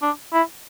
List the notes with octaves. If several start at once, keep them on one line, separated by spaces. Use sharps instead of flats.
D4
E4